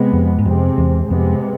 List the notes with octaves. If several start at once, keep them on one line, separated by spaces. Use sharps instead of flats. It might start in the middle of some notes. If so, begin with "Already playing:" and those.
Already playing: C3 G#3 B3
F2
G#2
F2 C3 G#3 C4
E2
F2 C3 G#3 B3